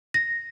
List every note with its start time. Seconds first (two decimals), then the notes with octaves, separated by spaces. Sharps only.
0.14 A#6